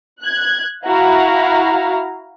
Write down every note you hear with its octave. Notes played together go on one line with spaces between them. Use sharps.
F#6 G#6
E4 F#4 F5 A#5